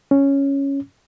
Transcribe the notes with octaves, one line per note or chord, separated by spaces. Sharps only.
C#4